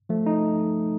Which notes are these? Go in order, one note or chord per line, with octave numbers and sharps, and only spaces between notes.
F3 A3
D#4